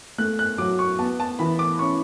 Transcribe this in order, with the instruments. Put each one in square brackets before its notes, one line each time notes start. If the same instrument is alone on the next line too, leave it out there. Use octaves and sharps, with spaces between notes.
[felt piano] A3 [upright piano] F#6
[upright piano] F#6
[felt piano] F#3 [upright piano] D6
[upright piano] C#6
[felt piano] B3 [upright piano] A5
[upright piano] A5
[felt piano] E3 [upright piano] B5
[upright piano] D6
[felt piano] C#4 [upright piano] C#6